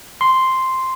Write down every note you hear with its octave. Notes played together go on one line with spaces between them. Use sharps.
C6